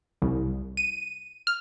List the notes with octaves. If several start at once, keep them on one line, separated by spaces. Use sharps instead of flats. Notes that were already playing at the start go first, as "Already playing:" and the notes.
C2
D#7
F6